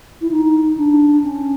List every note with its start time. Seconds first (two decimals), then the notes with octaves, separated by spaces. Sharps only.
0.21 E4
0.31 D#4
0.77 D4
1.24 C#4